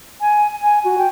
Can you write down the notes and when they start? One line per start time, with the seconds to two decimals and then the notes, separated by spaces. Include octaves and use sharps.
0.21 G#5
0.62 G#5
0.85 F#4
0.98 G5